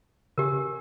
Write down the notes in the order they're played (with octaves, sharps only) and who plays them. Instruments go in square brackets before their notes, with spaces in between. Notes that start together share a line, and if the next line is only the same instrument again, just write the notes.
[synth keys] C#3 G#5 [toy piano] G4 A#4